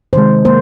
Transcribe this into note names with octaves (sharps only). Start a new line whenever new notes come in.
C3 D#3 G#3 C5
A#3 C5